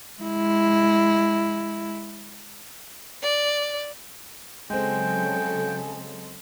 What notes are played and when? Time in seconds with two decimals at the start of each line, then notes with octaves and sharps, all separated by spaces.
0.21 G#3 E4
3.22 D5
4.70 C#3 F#3 G#3 C4 A4 G5 G#5